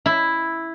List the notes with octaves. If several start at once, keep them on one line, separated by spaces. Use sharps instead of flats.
E4